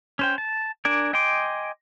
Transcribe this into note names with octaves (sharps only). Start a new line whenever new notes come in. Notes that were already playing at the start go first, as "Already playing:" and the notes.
C#4 C5 G5
A5
D4 A#4 D5 G#5
D#5 G5 G#5 C6 D6